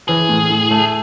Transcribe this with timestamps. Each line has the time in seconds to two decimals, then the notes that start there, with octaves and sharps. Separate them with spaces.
0.08 E3 G#4
0.29 A2
0.50 A2
0.71 A3